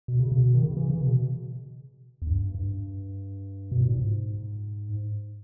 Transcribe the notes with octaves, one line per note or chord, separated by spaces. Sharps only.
B2
C#3
B2
D#3
C#3
E3
C#3
B2
E2
G2
G2
B2
A#2
G#2